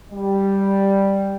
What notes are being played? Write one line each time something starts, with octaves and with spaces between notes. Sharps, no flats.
G3